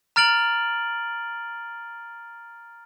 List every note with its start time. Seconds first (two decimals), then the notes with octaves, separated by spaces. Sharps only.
0.16 A#5 F6 A6 D7 F#7